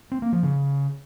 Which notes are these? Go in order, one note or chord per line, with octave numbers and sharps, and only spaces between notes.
C4
A#3
F3
C#3